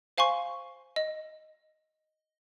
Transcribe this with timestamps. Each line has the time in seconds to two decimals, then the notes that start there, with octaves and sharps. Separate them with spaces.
0.18 C5 F5 G#5 C6 C#6
0.96 D#5